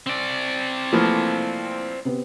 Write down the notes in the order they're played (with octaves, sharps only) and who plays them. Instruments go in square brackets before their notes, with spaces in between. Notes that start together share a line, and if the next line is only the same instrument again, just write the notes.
[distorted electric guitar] C4 D5
[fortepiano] E3 F3 [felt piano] A3 A#3
[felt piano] C3 B3